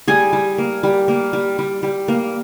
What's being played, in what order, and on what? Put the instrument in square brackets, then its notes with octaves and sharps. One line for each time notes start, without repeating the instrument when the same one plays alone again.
[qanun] G3 G#4 G#5
G3
A#3
G3
A#3
G3
G3
G3
A#3